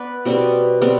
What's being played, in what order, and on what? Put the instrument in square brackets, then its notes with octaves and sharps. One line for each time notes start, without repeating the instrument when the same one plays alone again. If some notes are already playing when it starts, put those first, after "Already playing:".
Already playing: [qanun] B3 B4 D5
B2 G3 B3 C4
B2 G3 B3 C4